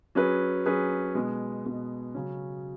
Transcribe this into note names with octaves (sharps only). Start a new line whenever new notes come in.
F#3 C#4 G#4 B4
F#3 C#4 G#4 B4
B2 G#3 B3
B2 G#3 B3
C#3 F#3 C#4